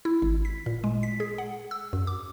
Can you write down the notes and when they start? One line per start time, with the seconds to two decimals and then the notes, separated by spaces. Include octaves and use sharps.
0.05 E4
0.22 G#1
0.45 B6
0.66 A#2
0.84 G#3
1.03 B6
1.20 G#4
1.38 F#5
1.71 E6
1.93 F#2
2.07 D6